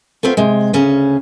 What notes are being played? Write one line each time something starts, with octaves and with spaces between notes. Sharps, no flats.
A3 B3 C4 F4
C3 G#3
D2 C#3 C#4